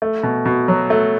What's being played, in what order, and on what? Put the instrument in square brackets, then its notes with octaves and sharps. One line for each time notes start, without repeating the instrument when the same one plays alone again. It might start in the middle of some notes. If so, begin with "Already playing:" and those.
[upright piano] A3
B2
B2
F#3
A3